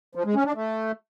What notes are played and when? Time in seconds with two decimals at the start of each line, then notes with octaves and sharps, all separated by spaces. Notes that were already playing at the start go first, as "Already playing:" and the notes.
0.15 F3
0.25 G#3
0.35 C#4
0.45 D4
0.55 A3